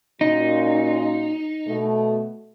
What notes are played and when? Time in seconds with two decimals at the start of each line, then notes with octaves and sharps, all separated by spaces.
0.21 A#2 C#4 D#4 F#4
1.67 B2 A3